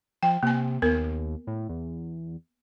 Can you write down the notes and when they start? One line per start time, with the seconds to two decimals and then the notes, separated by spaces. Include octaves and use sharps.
0.23 F3 G5
0.43 C3 A#3 G#5
0.82 D#2 B3 A#4
1.47 A2
1.69 E2